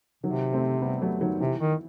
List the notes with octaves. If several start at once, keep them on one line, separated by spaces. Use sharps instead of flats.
C3 D#3 F#3
A3 C4
G3 B3
F#3 A3
D#3 F#3
C3 E3
D#3